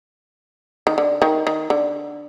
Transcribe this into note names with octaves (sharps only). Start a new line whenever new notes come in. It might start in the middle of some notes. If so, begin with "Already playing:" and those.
D#3
D3
D#3
D#3
D3